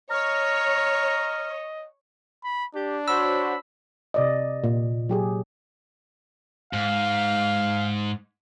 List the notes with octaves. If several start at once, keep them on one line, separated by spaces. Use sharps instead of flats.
C#5 D#5 A#5 F6
B5
D4 G4
F#4 C5 C#5 B5 E6
C3 D5 D#5
A#2
F#3 G4 G#4
G#2 F5